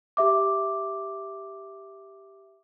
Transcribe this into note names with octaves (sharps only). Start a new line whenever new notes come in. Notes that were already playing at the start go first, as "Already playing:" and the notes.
G4 E5 D6